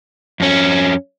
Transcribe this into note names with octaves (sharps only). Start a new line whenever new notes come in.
F2 C#4